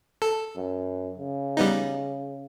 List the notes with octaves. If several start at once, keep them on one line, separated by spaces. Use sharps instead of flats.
A4
F#2
C#3
G3 B3 D#4